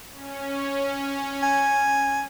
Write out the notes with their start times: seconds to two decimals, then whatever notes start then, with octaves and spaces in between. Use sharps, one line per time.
0.13 C#4
1.43 G#5